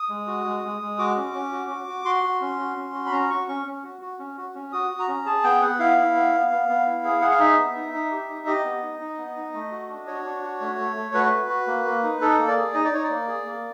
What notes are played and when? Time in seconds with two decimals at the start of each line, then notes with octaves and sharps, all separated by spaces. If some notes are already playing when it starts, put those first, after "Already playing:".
Already playing: D#6
0.09 G#3
0.27 F#4
0.45 G#3
0.63 G#3
0.81 G#3
0.98 F#4 D6
1.16 C#4
1.34 C#4
1.52 F#4
1.70 F#4
1.88 F#4
2.05 F#4 C6
2.23 F#4
2.41 C#4
2.59 F#4
2.77 C#4
2.94 F#4
3.06 B5
3.12 C#4 A#5
3.30 F#4 C#6
3.48 C#4 C#6
3.66 C#4
3.84 F#4
4.01 F#4
4.19 C#4
4.37 F#4
4.55 C#4
4.72 F#4 D#6
4.91 F#4
4.99 A#5
5.08 C#4
5.26 G#4 A5
5.44 B3 G5
5.62 B3 F#5
5.79 E4 F5
5.97 E4
6.15 B3
6.33 B3
6.51 B3
6.69 B3
6.87 E4
7.04 G#4
7.21 G#4 F#5
7.31 F5
7.40 D#4 E5
7.58 B3
7.76 D#4
7.94 D#4
8.11 G4
8.29 D#4
8.47 G4 D#5
8.64 B3
8.82 D#4
9.00 D#4
9.18 B3
9.36 D#4
9.54 A3
9.71 F#4
9.89 D4
10.07 F#4 C#5
10.25 D4
10.43 F#4
10.61 A3
10.78 A3
10.96 A3
11.14 F#4 B4
11.32 F#4
11.50 F#4
11.67 A#3
11.85 A#3
12.03 D#4
12.21 D#4 A4
12.39 A#3
12.48 D5
12.56 G#4
12.74 D#4 D#5
12.85 D5
12.92 D#4 C#5
13.04 D5
13.10 A#3
13.28 G#4
13.46 A#3